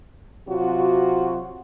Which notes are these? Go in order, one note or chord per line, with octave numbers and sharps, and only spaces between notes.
C3 F#3 F4 F#4